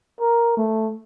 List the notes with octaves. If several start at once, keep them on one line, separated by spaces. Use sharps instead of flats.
A#4
A3